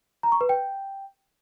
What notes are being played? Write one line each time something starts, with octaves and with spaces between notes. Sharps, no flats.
A#5
C#6
B4
G5